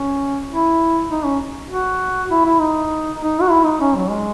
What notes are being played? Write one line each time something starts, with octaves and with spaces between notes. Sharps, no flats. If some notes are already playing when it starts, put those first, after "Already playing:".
Already playing: C#4
E4
D#4
C#4
F#4
E4
E4
D#4
D#4
F#4
E4
D#4
C#4
F#3
G#3